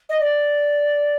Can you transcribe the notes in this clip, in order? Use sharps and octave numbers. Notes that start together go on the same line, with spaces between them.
D#5
D5